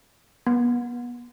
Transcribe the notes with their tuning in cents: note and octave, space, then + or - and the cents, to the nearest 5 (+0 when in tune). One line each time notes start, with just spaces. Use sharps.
B3 -35